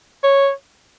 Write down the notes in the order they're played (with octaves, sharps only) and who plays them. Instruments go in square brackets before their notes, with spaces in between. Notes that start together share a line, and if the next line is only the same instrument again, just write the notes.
[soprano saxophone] C#5